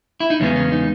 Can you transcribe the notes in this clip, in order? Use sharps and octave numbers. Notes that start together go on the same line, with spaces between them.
E4
D#4
E2 C#3 G#3 B3 C#4
C#4
D#4